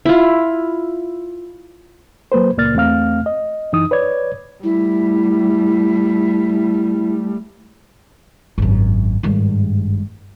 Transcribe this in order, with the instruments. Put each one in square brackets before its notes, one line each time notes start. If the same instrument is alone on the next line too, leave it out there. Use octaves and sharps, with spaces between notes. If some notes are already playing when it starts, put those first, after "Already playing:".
[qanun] E4 F4
[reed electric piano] F#3 A#3 B4 C5
C#2 A#2 A#3 D5 F6 A6
E2 A3 C4 F5 F6
D#5
F#2 E3 D#4 D#6
B4 C#5 D5 G#6
[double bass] G3 A3 [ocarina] E4
[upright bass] G#1 F#2
G#1 G2